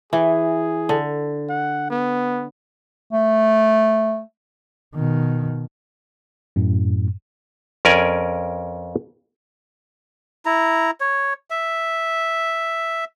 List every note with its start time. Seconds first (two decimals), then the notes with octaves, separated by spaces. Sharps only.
0.13 E3 G#4
0.89 D3
1.50 F#5
1.90 B3
3.12 A3
4.96 B2 D#3
6.56 F#2 A2
7.85 F2 C#4 A#4 D5 G#5
10.46 E4 A#5
11.00 C#5
11.50 E5